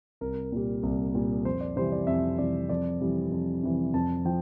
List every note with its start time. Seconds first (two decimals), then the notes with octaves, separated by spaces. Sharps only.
0.21 C2 A#4
0.52 A#2 G3
0.83 C2
1.14 A#2 G3
1.45 F2 C5
1.61 D5
1.76 C3 E3 G3 C5
1.92 D5
2.07 F2 E5
2.38 C3 E3 G3 D5
2.69 F2 D5
3.01 C3 E3 G3
3.31 F2
3.63 C3 E3 G3
3.94 F2 A5
4.25 F3 G5